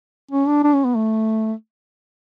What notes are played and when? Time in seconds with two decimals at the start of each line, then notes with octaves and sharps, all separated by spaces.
0.31 C#4
0.47 D4
0.64 D4
0.74 C#4
0.85 B3
0.95 A3